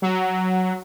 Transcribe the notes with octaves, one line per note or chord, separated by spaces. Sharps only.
F#3